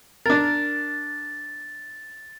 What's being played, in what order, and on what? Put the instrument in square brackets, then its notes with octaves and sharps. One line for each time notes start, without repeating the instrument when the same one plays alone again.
[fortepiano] D4 A#4 [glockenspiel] A6